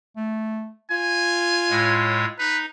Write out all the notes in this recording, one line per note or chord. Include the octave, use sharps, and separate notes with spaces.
A3
F4 G#5
A2 G#3 C#5
D#4 B4